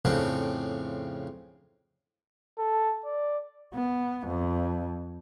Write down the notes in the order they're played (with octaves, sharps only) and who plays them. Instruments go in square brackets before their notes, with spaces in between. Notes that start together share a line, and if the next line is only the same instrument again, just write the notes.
[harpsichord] F2 A2 C#3 C4 D4
[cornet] A4
D5
[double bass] B3
F2